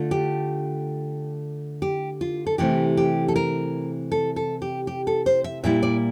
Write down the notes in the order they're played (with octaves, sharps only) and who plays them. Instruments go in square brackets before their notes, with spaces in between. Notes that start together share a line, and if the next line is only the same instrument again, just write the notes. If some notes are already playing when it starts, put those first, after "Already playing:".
Already playing: [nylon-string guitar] D3 A3 D4 F4
G4
G4
F4
A4
C3 E3 A3 C4 G4
G4
A4
A#4
A4
A4
G4
G4
A4
C5
E5
A#2 G3 A#3 E4 E5
D5